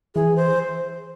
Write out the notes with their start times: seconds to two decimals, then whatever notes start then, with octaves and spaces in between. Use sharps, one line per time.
0.15 E3 G#4
0.36 C5